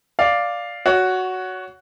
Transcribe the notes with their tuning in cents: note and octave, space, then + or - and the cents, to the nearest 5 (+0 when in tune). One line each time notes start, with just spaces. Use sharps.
D5 +0 F5 +0
F#4 +0 C#5 +25